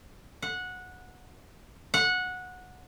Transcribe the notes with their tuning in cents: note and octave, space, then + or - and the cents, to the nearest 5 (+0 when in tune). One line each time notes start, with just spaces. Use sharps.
F#5 -15
F#5 -15